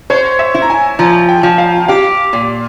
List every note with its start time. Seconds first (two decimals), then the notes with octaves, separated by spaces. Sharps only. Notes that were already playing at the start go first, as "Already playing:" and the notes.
0.10 C5 C#5
0.39 E5
0.54 E4
0.62 A#5
0.70 G#5
0.99 F3 A#5
1.29 G5
1.43 F3
1.58 F5
1.88 G4 F5
2.33 A#2